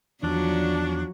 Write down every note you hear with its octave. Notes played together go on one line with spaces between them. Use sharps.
E2 D#3 F3 F#3 D4 F#4